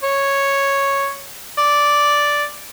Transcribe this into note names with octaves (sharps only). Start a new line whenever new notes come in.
C#5
D5